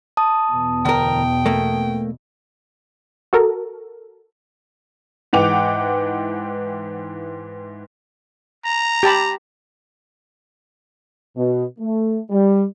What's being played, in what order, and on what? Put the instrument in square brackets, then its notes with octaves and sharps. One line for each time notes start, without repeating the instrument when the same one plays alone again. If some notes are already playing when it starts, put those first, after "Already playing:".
[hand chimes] A5 D#6
[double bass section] E2 B2
[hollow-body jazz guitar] D2 A#4 [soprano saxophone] G5
[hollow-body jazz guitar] A3 A#3
[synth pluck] F#4 A4 A#4
[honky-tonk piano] G#2 E3 F#5 G5 D6 F7
[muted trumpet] A#5
[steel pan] G4 A5 B5
[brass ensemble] B2
A3
G3